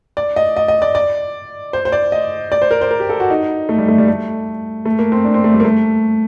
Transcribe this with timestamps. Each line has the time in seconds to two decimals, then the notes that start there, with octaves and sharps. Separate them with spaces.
0.17 D5
0.36 D#5
0.56 D#5
0.68 D#5
0.82 D5
0.95 D5
1.73 C5
1.85 C5
1.92 D5
2.12 D#5
2.52 D5
2.62 C5
2.71 A#4
2.81 C5
2.91 A#4
3.00 G4
3.09 A4
3.20 F#4
3.30 D#4
3.69 A3
3.78 G3
3.88 A3
3.98 G3
4.08 A3
4.86 A3
4.99 A#3
5.12 C4
5.25 D4
5.34 C4
5.44 A3
5.54 G3
5.60 A#3
5.65 A3